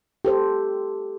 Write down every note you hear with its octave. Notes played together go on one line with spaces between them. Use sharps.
G4 A4 C5